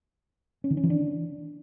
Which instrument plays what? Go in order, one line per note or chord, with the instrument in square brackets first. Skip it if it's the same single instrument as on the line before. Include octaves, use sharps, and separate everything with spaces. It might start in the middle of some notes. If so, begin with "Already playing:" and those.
[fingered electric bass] C#4
D#3
C#4
E3
D4